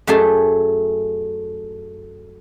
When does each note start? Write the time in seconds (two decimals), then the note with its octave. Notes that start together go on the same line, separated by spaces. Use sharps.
0.07 F#2 A3 G4 G#4 A5